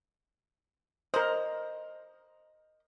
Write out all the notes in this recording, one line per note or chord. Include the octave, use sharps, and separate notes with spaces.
A#4 C5 D#5